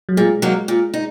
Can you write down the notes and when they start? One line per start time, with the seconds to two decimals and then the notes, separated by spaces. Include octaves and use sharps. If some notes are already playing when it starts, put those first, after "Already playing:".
0.09 F#3
0.17 A#2 G#3
0.42 F#3 A#3 D#4
0.68 A#2
0.94 D#4